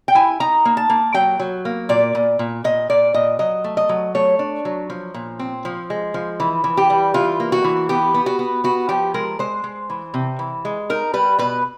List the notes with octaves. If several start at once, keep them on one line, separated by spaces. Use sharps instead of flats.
G5
E4 G#5
D#4 A#5
A#3
A5
A#3
F#3 G5
F#3
A#3
A#2 D5
A#2
A#2
A#2 D#5
A#2 D5
A#2 D#5
F#3 D#5
A3
D#5
F#3
A3 C#5
D4
F#3
F3
A#2
C4
F3
G#3
F3
E3
E3
G4
G3
E3 F4
A#3
F#4
E3
B3 G4
B3
F#4
B3
B3 F#4
F3 G4
G#3 A#4
G#3 C5
G#3
E3
C3
E3
G#3
D#4 A#4
G3 B4
B2 B4